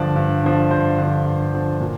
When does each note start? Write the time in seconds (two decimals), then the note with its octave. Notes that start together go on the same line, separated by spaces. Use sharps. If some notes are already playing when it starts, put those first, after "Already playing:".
Already playing: G2 D3 F3 D5
0.16 G2
0.43 D3 F3
0.71 G2 C5
0.98 D3 F3
1.26 G2
1.54 D3 F3
1.80 A#2